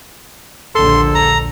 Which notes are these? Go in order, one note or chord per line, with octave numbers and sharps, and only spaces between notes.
A#1 D#2 D3 A4 C6
A#5